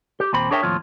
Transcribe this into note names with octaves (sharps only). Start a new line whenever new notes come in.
G4
D#2 A#2 C4 B5
D4 G#4 A#4 C#5 E5 G5
D#2 A2 F3 C4 F4 C#5